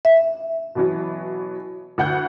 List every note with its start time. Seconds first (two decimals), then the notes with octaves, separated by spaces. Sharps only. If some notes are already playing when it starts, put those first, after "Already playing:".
0.05 E5
0.75 B2 E3 F#3
1.98 D2 F#5 G6